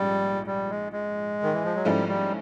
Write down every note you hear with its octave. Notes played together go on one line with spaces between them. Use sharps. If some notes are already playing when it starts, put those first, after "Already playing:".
Already playing: A#1 G#2 G3 C#4
G3
G#3
G#3
D#3
E3
F3
F#3
G#2 F3 G3 A3 C#4 E4
G3